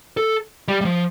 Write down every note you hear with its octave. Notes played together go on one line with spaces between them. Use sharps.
A4
G3
G3
F3